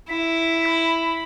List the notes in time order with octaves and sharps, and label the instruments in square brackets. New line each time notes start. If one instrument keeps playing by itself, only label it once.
[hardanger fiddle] E4 [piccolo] B6
[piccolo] B5